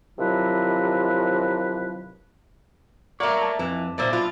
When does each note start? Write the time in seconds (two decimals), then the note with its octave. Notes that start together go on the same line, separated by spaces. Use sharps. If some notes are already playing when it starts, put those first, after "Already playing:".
0.19 C3 D#3 F3 F#3 E4 B4
3.20 A3 A#3 A#4 C#5 D5 E5 A#5
3.41 A5
3.59 F2 E3
3.98 B1 A#2 A#3 C5 D5 E5
4.13 F4 B4